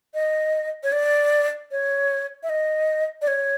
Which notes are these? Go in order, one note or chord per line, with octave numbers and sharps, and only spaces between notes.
D#5
C#5
D5
C#5
E5
D#5
D5
C#5